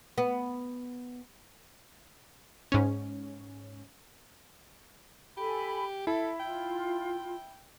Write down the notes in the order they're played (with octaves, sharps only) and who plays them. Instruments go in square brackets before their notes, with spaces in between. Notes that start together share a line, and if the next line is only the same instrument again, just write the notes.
[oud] B3
[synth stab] G#2 C#4
[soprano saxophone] G4 [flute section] A4 G#5 B5
[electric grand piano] E4 [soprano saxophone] A4 [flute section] E5
[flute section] F4 [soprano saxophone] G5